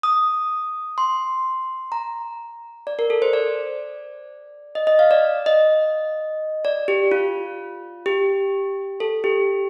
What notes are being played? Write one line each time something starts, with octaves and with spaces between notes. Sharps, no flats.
D#6
C6
A#5
D5
A#4
A4
C5
D5
D#5
D#5
F5
D5
D#5
D5
G4
F4
G4
A4
G4